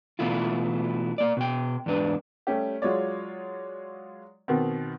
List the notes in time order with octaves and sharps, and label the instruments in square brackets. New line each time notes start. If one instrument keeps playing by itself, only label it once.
[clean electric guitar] B2 E3 A3 E4 F4
A#3 D5
B2 G5
E2 G#2 D4 B4
[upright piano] G3 A3 C#4 G4
F#3 G#3 F4 C#5 D5
B2 D#3 B3 C4